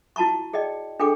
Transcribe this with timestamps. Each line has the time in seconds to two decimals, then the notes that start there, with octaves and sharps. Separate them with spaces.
0.16 E4 F#4 A5 A#5 C#6
0.53 G#4 D5 D#5 G5
0.99 D4 G#4 A4 G5 D6